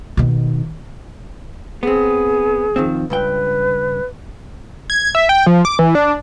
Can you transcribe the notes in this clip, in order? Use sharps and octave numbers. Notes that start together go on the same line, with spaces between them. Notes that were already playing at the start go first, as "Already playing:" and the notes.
B2 D#3
B3 C4 G#4
D#3 F3 C4
C#2 G2 B4 G5
G#6
E5
G5
F3
D6
E3
D4